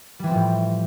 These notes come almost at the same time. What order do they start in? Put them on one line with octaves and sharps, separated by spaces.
G3 E3 C4 F3 A2